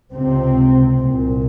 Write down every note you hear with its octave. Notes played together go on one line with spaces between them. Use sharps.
C#2 C3 C4
C2 A#2